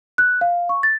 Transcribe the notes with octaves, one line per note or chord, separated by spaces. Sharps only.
F#6
F5
C#6
A6